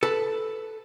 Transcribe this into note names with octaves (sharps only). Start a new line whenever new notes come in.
A4 B4 A5